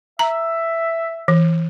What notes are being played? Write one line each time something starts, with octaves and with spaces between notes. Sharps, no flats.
E5 A#5
E3